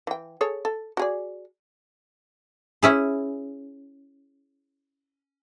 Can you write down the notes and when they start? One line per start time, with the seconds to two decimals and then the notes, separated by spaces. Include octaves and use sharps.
0.07 E3 G5
0.41 G#4 A4 C#5
0.65 A4
0.97 F#4 G#4 D5
2.83 C#4 E4 G#4